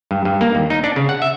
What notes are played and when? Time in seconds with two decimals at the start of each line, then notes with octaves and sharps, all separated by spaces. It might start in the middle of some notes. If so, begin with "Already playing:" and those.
0.11 G2
0.25 G2
0.41 A#3
0.55 D#2
0.70 D#4
0.84 D4
0.96 C#3
1.09 F#5
1.22 E5